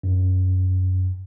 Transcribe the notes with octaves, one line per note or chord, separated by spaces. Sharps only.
F#2